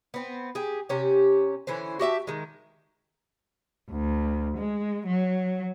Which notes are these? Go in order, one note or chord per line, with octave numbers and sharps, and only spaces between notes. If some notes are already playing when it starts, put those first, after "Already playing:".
B3 C4
G4 G#4
C3 C#4 G4
D3 E3 C#4 C5
F#4 G4 E5 A5
D#3 G#3
D2
G#3
F#3